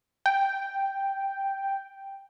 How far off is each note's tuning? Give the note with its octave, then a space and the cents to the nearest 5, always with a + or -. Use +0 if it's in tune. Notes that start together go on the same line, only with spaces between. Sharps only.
G5 +0